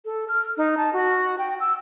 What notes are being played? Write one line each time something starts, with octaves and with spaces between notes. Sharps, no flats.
A4
F6
D#4
A5
F#4
G5
E6